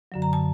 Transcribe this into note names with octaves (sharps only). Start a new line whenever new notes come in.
F#2 D3 F#3
A#5
A5